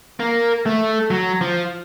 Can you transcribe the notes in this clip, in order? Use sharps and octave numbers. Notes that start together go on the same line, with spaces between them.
A#3
A3
F#3
F3